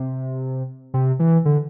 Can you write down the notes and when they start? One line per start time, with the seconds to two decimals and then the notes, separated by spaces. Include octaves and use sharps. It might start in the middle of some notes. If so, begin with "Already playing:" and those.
Already playing: C3
0.94 C3
1.20 E3
1.45 D3